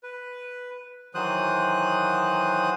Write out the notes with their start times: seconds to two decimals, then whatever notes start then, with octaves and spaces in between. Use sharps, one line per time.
0.03 B4
1.15 D#3 E3 F#3 C5 D#6 F#6